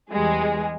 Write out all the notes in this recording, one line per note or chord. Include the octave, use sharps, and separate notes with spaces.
E2 E3 G3 G#3 G#4